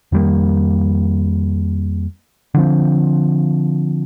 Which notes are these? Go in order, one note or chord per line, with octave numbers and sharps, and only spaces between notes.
F2 D#3 G3 A#3
D3 F3 C4